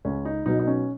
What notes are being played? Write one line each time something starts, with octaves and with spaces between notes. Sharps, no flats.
C#2 C#4
D#4
B2 F#3 D#4
D#4
C#4